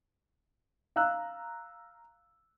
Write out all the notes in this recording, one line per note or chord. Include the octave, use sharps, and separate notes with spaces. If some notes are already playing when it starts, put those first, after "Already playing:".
F5 A#5 E6 F#6